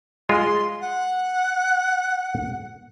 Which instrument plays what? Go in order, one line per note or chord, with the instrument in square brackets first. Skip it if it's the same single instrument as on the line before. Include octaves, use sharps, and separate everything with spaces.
[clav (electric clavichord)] G#3 F4 [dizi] C6
[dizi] F#5